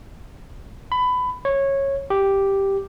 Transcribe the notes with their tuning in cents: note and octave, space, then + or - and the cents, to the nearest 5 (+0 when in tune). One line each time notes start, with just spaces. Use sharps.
B5 +20
C#5 -15
G4 +0